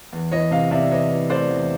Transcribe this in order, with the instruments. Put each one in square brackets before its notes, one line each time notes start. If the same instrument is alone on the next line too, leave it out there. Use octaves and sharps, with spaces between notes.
[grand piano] E2
E3 C#5 D#5
C3 D#5 F5
C3 D5 E5
E3 C#5 D#5
E3
A3 C5 D5
E2